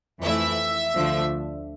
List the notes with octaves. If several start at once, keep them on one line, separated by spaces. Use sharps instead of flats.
F2 E3 A3 E4 E5
D2 D3 F3 A3 D4